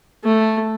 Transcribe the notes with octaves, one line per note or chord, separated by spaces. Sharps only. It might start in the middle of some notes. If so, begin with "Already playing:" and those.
A3